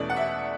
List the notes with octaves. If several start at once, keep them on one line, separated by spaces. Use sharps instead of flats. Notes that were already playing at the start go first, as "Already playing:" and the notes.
Already playing: E2 B2 A3 C#4 D5
F#5
E5